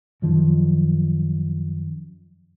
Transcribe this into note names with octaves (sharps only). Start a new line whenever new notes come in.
F#2 D#3 F3